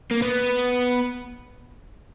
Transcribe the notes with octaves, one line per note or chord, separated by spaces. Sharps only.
A#3
B3